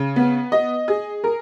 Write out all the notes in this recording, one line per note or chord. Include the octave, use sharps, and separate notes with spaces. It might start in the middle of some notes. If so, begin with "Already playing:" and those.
Already playing: C#3
B3
D#5
G#4
A#4